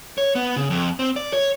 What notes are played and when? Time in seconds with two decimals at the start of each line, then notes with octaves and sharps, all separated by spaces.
0.18 C#5
0.35 B3
0.57 C#3
0.70 F2
0.99 C4
1.16 D5
1.33 C#5